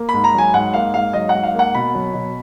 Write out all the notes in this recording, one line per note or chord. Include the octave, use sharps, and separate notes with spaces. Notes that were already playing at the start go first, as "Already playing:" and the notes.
Already playing: A#3
G#2 B5
A#5
F#3 G#5
G#2 F#5
A#3 F5
G#2 F5
F#3 D#5
F#5
G#2
F5
A#3 F#5
B2 B5
F#3
B2